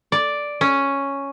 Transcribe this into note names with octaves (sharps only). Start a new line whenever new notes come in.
D5
C#4